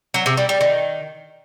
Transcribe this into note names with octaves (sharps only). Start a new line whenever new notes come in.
F#3
C3
G3
G3
D#3